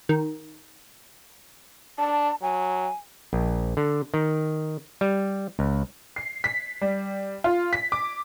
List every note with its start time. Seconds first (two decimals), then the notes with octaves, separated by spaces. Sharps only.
0.09 D#3
1.98 D4 A5
2.42 F#3 G#5
3.33 A#1
3.77 D3
4.14 D#3
5.01 G3
5.59 C#2
6.16 C7
6.44 B6
6.81 G3
7.44 F4
7.73 B6
7.92 D6